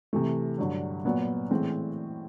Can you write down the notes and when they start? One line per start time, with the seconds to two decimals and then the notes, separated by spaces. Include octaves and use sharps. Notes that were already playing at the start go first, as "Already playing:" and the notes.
0.13 C3 E3 A3
0.58 G2 D3 F#3
1.05 A#2 F#3 B3
1.51 A2 E3 G#3 C4